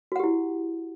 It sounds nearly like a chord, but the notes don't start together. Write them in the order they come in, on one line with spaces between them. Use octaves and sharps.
F#4 F#5 G4 E4